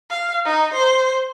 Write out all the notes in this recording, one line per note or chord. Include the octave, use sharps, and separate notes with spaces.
F5
D#4
C5